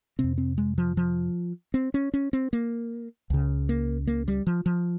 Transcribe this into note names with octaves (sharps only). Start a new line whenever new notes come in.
F2 C3 C4
C4
G#3
F3
F3
C4
C#4
C#4
C4
A#3
C#2 C#3
A#3
A#3
G3
F3
F3